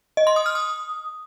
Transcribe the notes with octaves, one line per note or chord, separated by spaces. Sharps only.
D#5
C6
D#6
F6
D#6